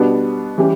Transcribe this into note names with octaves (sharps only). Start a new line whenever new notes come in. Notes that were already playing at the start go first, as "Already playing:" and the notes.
Already playing: B2 G3 B3 D4
E3 G3 C#4 G4